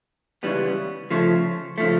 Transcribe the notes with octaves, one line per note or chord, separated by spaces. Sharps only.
C#2 C#3 E3 G3 B3
C#3 F3 A3
C#3 F3 A3